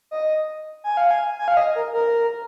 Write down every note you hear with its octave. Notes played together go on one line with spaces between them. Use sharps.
D#5
G#5
F5
G#5
G#5
F5
D#5
A#4
A#4